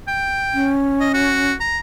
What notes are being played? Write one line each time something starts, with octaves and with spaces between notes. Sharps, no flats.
G5
C#4
D#5
F#4
A#5